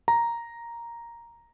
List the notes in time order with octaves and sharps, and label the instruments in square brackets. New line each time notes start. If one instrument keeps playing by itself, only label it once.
[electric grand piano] A#5